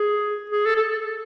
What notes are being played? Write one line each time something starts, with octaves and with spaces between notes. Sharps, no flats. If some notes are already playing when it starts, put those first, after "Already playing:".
Already playing: G#4
G#4
A4
A4